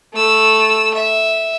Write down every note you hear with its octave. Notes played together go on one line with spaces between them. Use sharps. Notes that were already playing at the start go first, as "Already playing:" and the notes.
A3 E6
E5